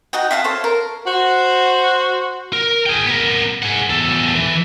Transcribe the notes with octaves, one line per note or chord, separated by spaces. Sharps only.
D#4 F#4 D#5 G5
E5 F5 A5 D#6
A4 C5 C#5 F5
A#4
F#4 C5
A#4
G#4 G5
B3 A#4
G#4 F#5
E2 A4
E3